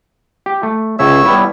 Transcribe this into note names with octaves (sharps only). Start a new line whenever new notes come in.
G4
A3
C#2 C#3 C#5 E5 E6
G3 B3 E4